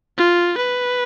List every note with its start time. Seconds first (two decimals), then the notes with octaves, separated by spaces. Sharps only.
0.18 F4
0.58 B4